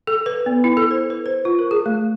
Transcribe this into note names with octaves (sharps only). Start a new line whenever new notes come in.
A4
B4
B3
E4
A4
C5
B4
C5
F4
A#4
G#4
A3